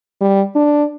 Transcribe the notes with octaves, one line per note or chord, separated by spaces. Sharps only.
G3
D4